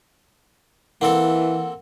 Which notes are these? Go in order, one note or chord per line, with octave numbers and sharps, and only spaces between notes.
E3 A#3 C4 A4 F#5